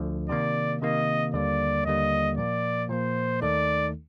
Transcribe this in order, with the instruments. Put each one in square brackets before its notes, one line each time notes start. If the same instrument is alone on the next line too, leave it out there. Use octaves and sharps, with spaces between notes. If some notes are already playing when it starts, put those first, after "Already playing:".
Already playing: [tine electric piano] D2 D3 F3
[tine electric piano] C3 D#3 A#3 [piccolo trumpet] D5
[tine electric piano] C3 D#3 A#3 [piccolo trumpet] D#5
[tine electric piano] D#2 D3 G3 A#3 [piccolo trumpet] D5
[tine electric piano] D#2 D3 G3 A#3 [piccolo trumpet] D#5
[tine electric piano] A#2 F3 A#3 [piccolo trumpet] D5
[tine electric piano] A#2 F3 A#3 [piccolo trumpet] C5
[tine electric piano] D#2 D#3 A3 D#4 A4 [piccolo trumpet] D5